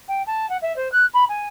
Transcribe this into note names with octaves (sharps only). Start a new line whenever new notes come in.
G5
A5
F#5
E5
C5
F#6
B5
G#5